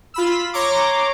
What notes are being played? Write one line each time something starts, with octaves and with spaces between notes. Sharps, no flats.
F4 B5 E6
C#5 A#5 C6 D6